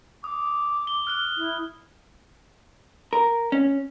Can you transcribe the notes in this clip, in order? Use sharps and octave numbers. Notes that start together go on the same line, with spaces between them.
D6 D#6
G7
F6 F#6 G7
E4
A#4
C#4